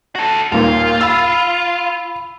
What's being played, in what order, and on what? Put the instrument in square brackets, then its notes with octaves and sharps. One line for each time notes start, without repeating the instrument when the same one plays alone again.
[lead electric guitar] F#4 A4
[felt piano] D#2 A#2 [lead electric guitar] F4
[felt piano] B5 E6